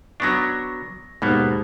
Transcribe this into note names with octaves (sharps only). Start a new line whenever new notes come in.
F#3 B3 D4 C#6 A#6
D#2 G#2 B2 A#3 B3